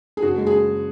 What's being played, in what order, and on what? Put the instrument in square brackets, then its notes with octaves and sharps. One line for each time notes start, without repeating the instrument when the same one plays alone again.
[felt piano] G#4
F#1 F#4
G#3
G#4
G#3